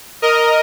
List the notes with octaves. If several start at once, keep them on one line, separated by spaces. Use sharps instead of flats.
A#4 D#5